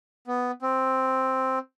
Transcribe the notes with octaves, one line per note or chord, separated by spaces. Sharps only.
B3
C4